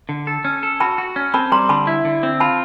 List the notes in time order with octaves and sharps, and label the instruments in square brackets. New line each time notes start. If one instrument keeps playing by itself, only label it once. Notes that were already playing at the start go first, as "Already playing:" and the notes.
[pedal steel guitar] D3
A4
C#4
A4
[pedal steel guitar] F#4 [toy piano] A5 B5
[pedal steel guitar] F#4
C#4
[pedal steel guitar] C4 [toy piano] A5 B5
[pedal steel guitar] G3 [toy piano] A#5 C6
[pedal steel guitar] D3 [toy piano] A5 B5
[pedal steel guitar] E4
D3
C4
[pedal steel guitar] F4 [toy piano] A5 B5